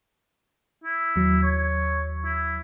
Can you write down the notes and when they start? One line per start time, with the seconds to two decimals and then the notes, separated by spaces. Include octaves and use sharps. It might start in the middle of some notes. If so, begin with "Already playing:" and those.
0.84 E4
1.16 D#2 F#3
1.43 C#5
2.25 E4